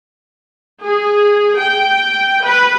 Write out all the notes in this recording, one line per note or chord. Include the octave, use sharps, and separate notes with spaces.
G#4
G5
B4